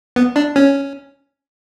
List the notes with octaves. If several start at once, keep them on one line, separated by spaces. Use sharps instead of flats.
B3
D4
C#4